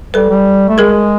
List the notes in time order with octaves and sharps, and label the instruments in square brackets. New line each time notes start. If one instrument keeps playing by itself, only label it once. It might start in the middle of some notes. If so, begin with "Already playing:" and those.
[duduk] G3 [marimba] A4 B4
[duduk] G3
A3
[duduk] G#3 [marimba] G#4 A#4